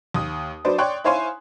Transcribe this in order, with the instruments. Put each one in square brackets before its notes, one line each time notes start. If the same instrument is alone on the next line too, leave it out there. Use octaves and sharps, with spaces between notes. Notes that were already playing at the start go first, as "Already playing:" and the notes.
[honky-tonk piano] D#2 D#6
F#3 D4 B4 C5 D5
C#5 D5 G5 C6 C#6 F#6
E4 C5 C#5 F5 G#5 C6